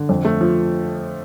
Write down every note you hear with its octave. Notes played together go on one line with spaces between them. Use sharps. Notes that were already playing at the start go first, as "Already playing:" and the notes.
Already playing: D3
F2
A3
F3